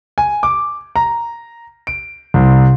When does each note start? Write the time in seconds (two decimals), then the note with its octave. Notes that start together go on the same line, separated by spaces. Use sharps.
0.18 G#5
0.43 D6
0.96 A#5
1.87 D7
2.34 C2